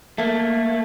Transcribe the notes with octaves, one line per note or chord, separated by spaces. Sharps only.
A3 A#3